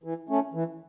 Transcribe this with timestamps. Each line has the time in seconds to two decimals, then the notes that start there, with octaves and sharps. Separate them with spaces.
0.04 E3
0.29 A3 C#4
0.54 E3